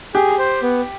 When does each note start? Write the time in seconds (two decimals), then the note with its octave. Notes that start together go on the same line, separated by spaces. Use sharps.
0.14 G4 G#4
0.39 C5
0.62 B3